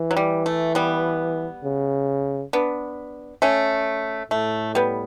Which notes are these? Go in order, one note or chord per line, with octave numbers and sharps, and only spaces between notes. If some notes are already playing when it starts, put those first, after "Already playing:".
Already playing: E3
F#3
G3
A3
G3 B3
C#3
B3 D4
A3 C#4
A2 A3
G3 B3